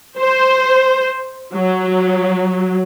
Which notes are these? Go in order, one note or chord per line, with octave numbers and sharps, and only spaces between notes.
C5
F#3